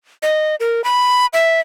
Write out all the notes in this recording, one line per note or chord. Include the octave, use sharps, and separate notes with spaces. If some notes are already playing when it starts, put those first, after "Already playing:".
D#5
A#4
B5
E5